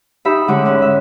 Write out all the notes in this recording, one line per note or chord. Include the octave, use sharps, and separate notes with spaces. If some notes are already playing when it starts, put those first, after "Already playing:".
D#4 G4 E5 B5
D3 G#3 C#4 E4 F#5 D6
G#2 C#4 F#5
E5